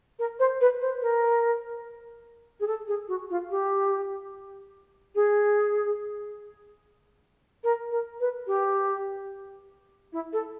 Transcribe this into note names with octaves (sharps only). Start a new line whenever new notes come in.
A#4
C5
B4
C5
A#4
G#4
A4
G#4
F#4
F4
G4
G#4
A#4
A#4
B4
G4
E4
A4